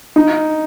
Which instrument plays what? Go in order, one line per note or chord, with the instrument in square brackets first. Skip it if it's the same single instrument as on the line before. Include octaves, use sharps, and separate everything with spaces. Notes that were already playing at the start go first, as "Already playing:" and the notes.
[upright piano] D#4